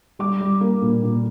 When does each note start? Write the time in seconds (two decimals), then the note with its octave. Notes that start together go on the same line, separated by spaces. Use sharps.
0.19 G3 D6
0.41 G3
0.61 A#3
0.82 A#2
1.04 A#2